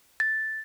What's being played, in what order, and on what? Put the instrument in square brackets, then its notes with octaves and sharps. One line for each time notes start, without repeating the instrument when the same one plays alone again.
[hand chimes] A6